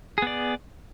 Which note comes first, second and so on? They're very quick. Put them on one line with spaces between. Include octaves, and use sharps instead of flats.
G#4 B3 D5